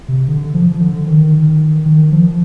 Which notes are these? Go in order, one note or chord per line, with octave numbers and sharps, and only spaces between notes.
C3
D3
F3
D3
D#3
D#3
F3